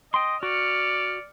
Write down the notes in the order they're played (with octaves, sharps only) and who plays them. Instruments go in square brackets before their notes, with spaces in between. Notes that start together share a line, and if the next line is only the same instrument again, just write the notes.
[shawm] D#5 [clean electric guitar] G5 C6
[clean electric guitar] F#4 [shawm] D5 [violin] F6 C#7